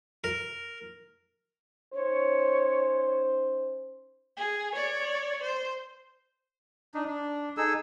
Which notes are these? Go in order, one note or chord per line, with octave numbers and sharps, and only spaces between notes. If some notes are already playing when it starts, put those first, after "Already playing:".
A#4
C#4 D#4 C5 C#5
G#4
C#5 D5
C5
D4 D#4
D4
D#4 G#4 A4 E6